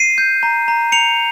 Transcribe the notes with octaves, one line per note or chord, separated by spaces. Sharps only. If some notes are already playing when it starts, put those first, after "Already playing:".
Already playing: C7 D#7
G6
A#5
A#5
A#5 C#7 F7